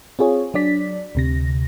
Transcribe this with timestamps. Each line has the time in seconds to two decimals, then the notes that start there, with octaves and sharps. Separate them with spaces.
0.19 C4 F4 G#4 C#5
0.54 F#3 D4 D5 B6
1.15 D2 C3 A#6